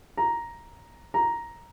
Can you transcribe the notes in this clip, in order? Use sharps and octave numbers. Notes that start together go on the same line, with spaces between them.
A#5
A#5